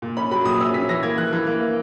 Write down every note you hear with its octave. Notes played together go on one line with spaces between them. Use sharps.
A#2
C#4 B5
F#3 B5
A#2 D#6
C#4 E6
C#4 B6
E3 A#6
A#3 G#6
E3 F#6
E3
A#3
A#3